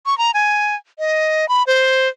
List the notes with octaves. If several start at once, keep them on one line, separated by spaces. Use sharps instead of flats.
C#6
A#5
G#5
D#5
B5
C5